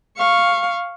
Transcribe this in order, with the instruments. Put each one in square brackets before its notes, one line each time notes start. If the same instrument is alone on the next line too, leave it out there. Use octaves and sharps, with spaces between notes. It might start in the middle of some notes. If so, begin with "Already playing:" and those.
[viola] F5 C#6